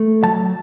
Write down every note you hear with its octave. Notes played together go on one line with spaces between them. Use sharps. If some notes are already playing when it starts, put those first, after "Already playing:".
Already playing: A3
F#3 A5